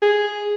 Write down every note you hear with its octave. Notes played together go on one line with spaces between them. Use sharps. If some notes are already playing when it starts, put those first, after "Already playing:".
G#4